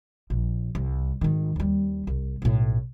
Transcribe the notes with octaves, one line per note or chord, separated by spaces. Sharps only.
A#1
C2
G#1 D#3
D#2 G3
C2
B1 A2